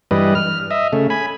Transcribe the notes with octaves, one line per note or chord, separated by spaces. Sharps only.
G2 E3 G3 B4 D#5
F6
D#5 E5
C#3 A3
G#5 B5